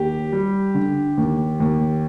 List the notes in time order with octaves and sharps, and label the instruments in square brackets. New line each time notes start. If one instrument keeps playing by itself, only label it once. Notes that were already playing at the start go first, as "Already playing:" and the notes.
Already playing: [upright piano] D#2 [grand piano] G4
[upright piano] G3
D3
D#2
D#2